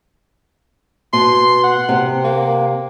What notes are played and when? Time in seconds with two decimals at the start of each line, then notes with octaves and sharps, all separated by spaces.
1.13 B2 C6
1.63 F#5
1.89 C3
2.24 A#3